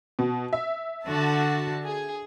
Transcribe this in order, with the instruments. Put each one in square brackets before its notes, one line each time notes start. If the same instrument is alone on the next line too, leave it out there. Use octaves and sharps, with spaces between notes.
[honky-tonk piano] B2
E5
[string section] D3 F#4 A5
G#4